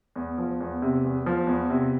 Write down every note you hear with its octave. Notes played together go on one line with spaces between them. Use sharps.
E2
F3
E2
C3
E2
F3
E2
C3